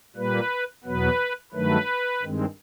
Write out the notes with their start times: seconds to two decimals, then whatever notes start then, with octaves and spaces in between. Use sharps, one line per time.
0.16 A#2 G3 A#3 B4
0.84 E2 B2 F#3 B3 B4
1.53 G2 D#3 F#3 A3 B4
2.22 G2 D#3 G#3 C4